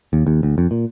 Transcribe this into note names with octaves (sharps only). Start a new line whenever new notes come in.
D#2
D#2
D2
F2
A#2